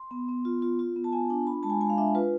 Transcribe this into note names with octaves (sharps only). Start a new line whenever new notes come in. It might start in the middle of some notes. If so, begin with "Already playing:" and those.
Already playing: C6
B3
B3
F4
F4
F4
B3
A5
B3 G#5
D4 G#5
F4 B5
G#3 A5
G#5
G#3 G#5
F5
D4 E5
F4 B4